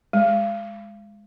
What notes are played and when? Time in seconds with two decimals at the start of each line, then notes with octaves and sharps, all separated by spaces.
0.13 G#3